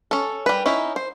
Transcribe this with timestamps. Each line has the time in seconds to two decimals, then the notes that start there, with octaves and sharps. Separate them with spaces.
0.11 C#4 A4
0.46 G3 B4
0.66 C#4 D#4 E4
0.96 C5